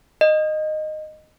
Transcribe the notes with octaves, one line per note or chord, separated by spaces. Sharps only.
D#5